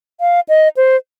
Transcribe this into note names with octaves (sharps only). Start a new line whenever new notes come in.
F5
D#5
C5